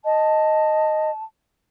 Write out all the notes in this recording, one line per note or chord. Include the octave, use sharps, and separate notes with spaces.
D#5 A5